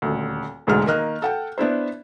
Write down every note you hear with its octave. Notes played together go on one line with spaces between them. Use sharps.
D#1 D2
E1 D2 G#2 G#4 F6
D#3 A#3 D#5 F6 F#6
A4 F#5 G5
B3 D4 E4 C5